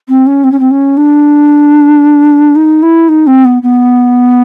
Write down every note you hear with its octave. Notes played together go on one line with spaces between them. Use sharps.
C4
C#4
C4
C#4
C4
C#4
D4
D#4
E4
D#4
C4
B3
B3